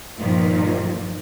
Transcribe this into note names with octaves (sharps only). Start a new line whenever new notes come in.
G2 A#2 D#3 F3